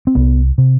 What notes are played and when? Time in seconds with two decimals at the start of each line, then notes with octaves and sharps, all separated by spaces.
0.07 C4
0.15 C2 B3
0.58 C3